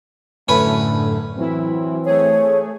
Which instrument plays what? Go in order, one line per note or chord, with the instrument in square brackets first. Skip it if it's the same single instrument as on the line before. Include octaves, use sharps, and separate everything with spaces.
[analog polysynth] F#2 A2 D3 [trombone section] A3 [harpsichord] C#4 B4
[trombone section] E3 C4 [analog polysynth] F#3 E4
[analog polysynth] A3 G#4 [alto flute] C#5